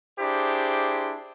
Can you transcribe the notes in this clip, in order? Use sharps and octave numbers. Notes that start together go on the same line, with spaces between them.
D4 E4 G4 G#4 C5